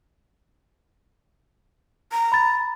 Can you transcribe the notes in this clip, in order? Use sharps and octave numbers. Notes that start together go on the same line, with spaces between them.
A#5
B5 A6